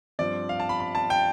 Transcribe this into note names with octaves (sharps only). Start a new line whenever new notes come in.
G2 F3 C4 D5
F5
A5
B5
B5
A5
G5